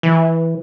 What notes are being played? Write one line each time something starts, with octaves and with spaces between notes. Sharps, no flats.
E3